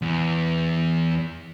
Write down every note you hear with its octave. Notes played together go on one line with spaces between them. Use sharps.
E2